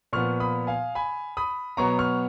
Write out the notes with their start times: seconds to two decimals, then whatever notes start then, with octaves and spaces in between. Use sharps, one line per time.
0.13 A#2 F3 B3 C#6 F6
0.40 B5 D#6
0.67 F5 G#5
0.95 G#5 B5
1.37 B5 D#6
1.77 B2 F#3 B3 A#5 C#6
1.99 C#6 F6